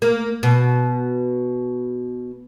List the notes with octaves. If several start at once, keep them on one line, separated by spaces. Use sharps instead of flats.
A#3
B2